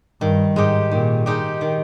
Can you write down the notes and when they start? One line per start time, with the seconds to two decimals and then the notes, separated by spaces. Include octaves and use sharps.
0.21 G2 D#3
0.56 G#2 G#3 D#4 G4
0.91 A#2 D#3
1.26 G#3 D#4 G4
1.61 D#3